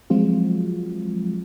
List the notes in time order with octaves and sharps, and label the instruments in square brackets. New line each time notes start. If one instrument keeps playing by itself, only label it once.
[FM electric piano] F3 F#3 G#3 C4 F4 F#4